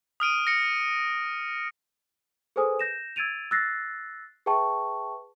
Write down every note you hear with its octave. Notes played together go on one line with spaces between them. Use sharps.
D#6 F6 D7 D#7
A#6 C#7
G#4 A4 B4 C5 G#5 D#6
G6 A#6 E7
E6 G#6 A6 D7 D#7 F7
E6 F#6 A6 A#6 C7
G#4 B4 E5 G5 A5 C#6